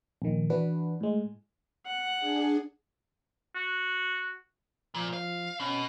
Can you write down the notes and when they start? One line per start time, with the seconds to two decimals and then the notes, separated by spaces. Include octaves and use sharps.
0.22 A#1 D#3
0.50 E3 D4 F#4 B4
1.01 A2 G#3
1.86 F#5
2.18 D4 G#4
3.55 F#4
4.95 A#2 F3
5.13 F5
5.60 B2 C#4